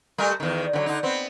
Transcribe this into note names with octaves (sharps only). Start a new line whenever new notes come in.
G3 A3 A#4
E2 D#3
D3 E3 F#3
D3 D#4
B3 C4